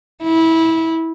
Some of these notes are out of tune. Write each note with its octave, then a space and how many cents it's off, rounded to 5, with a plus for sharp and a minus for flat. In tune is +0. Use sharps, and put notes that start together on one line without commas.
E4 -20